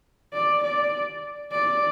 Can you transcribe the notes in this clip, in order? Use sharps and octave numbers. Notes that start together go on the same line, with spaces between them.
D5
D5
D5